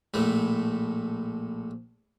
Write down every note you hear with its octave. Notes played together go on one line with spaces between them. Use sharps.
A#1 A2 A3